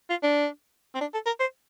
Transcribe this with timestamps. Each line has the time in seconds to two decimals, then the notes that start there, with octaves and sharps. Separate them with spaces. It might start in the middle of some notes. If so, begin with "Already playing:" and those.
0.10 F4
0.23 D4
0.95 C4
1.01 D4
1.14 A4
1.26 A#4
1.40 C5